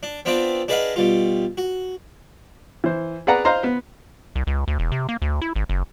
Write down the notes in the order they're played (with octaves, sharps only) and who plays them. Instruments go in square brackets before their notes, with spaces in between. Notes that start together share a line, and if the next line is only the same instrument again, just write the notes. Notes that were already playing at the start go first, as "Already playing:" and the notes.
[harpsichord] D4
B3 C4 D4 F4 D5
D4 G#4 B4 D#5 F5 F#5
B2 G3 F4
F#4
[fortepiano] E3 C5
G#4 B4 D5 F#5 A#5
C5 D#5 F5 A#5 C6
B3 B4
[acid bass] C2
C#2
D2
E1
C3
A#3
D2
E4
G#1
F#1